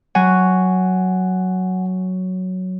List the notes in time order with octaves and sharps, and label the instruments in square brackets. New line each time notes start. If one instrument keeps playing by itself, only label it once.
[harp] F#3 [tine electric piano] F#5 G#5